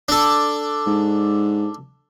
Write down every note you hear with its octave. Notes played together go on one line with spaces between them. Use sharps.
D4 A4
G#2